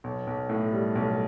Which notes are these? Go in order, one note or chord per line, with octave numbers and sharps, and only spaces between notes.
B1
B1
A2
G3
B1